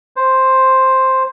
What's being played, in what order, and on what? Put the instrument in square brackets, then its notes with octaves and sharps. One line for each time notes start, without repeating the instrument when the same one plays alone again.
[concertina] C5